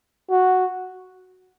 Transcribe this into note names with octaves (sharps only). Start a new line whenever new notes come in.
F#4